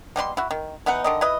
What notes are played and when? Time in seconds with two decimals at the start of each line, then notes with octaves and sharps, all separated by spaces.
0.16 B2 G3 E4 C6
0.37 E4 F#4
0.51 D#3
0.86 E3 B3 D#4 F#5
1.04 D3 D#3 D#5
1.21 E4 B4 D#5